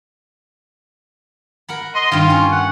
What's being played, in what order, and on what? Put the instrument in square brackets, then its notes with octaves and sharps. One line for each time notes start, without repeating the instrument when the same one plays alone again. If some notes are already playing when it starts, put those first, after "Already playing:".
[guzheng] A#4 F#5 B5
[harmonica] D#5 C6
[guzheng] G2 D#3 [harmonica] F4
[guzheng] C#4
[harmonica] F#5